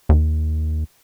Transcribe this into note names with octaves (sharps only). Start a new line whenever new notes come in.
D#2